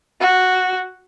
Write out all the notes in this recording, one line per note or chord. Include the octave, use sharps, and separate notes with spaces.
F#4